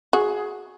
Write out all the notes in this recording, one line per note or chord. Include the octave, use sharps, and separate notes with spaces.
F#4 G#4